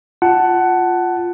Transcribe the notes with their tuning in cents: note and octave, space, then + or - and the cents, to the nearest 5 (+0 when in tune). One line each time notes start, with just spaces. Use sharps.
F4 +0 F#5 +15 A5 +0